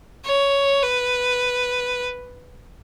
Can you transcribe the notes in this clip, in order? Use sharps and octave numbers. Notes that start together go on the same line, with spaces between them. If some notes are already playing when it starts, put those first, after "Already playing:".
C#5
B4